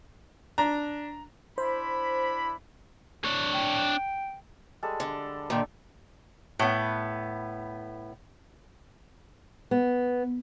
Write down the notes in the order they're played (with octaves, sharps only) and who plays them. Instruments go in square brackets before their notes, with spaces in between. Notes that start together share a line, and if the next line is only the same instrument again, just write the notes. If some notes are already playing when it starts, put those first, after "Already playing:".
[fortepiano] D4 [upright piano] A#5
[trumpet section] D4 E4 B5 [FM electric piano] C5
[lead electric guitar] D4 C#5
[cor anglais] G5
[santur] G3 G#3 A4
[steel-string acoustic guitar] D3
A#2 D3 D#3
[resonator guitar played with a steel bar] A2 B3
[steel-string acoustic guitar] B3